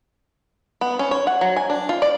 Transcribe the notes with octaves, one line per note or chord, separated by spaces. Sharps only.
B3
C#4
C#5
F#5
F#3
G#5
D4
F4
D5